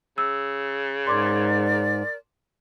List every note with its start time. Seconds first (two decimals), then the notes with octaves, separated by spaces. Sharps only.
0.18 C#3 E6
1.07 G#2 A#4 D5 C6 D6 G#6